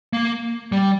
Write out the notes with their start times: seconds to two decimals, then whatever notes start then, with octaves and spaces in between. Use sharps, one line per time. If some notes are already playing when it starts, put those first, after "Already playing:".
0.13 A#3
0.72 G3